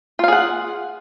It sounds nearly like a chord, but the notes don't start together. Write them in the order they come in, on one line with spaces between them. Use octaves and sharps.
F4 F5 G#4 F#5